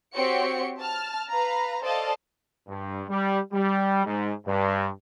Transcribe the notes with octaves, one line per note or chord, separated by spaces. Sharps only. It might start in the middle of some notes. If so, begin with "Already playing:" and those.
C4 F#4 G4 C#5 C#7
A5 F6
B4 F5 A#5
A4 C5 D5 D#5 F5 A5
G2
G3
G3
G#2
G2